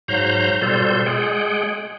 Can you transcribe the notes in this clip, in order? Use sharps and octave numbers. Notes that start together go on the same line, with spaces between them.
G#2 F#3 C5 F5 A#5 G6
B2 G3 F4 A4 C5 G6
G#3 G#4 F#5 G5